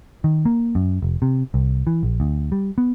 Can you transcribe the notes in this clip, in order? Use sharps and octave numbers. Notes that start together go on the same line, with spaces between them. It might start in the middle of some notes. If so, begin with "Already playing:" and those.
D#3
A#3
F#2
F1
C3
C2
E3
A#1
D2
G3
B3